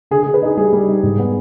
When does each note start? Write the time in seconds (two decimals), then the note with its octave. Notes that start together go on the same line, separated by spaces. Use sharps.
0.11 D3 G#4
0.23 D3 G#4
0.34 B4
0.42 D#4 G#4
0.57 G3 G#4
0.73 G3
0.88 D#4
1.03 G#2
1.19 B3